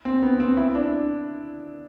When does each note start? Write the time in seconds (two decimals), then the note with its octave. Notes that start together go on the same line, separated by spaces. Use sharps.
0.05 C4
0.23 B3
0.40 C4
0.57 E4
0.75 D4